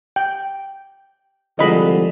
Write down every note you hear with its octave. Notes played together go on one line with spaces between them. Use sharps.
G5
C2 D3 F3 G#3 C4 D#5 B5